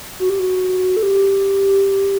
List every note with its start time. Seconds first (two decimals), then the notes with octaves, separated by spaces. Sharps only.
0.20 F#4
0.30 G4
0.39 F#4
0.97 A4
1.03 G4